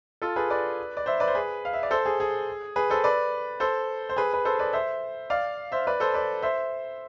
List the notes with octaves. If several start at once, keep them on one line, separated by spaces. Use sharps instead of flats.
F4 A4
G#4 B4
B4 D5
D5
C5 E5
B4 D5
C5
G#4 B4
F5
E5
D5
A4 C5
G#4
G#4
G#4 B4
A4 C5
B4 D5
A4 C5
C5
G#4 B4
B4
A4 C5
B4 D5
C5 E5
D5 F5
C5 E5
B4 D5
A4 C5
B4 D5
C5 E5